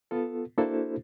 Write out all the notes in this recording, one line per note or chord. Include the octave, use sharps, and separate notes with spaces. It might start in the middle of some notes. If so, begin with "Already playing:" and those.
B3 F4 A4
A#3 D4 E4 F#4 A4 C5